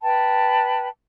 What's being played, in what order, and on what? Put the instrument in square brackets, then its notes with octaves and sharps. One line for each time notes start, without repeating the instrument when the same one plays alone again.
[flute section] B4 G5 A5